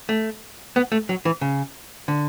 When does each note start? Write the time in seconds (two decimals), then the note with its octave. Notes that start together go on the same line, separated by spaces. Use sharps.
0.09 A3
0.76 B3
0.92 A3
1.09 F#3
1.25 E3
1.41 C#3
2.08 D3